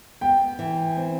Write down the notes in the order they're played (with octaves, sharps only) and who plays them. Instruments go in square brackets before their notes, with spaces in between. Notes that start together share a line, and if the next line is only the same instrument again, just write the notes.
[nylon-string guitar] B3 [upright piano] G5
[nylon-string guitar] E3
C4